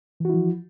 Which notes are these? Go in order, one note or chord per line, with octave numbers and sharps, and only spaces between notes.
E3 F3 E4 F#4